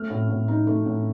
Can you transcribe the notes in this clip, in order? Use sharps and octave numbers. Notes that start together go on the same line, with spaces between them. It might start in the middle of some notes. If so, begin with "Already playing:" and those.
Already playing: A3 F6
A2
A2
D#4
A3
A2